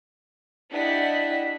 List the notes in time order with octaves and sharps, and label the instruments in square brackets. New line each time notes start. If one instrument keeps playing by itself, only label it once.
[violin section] D4 E4 G4 D#5 F#5 B6